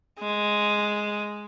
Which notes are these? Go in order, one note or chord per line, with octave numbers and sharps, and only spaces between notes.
G#3